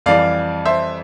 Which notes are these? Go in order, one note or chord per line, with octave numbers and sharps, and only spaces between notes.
F2 E3 G3 D5 F5
C5 E5